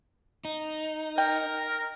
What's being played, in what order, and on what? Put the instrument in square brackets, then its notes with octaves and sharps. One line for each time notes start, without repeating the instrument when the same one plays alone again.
[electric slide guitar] D#4
[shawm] A#4 [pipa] G5